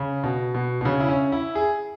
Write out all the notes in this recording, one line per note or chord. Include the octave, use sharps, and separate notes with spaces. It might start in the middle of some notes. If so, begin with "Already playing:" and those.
Already playing: C#3
B2
B2
B2
C#3
E4
C#4
E4
G#4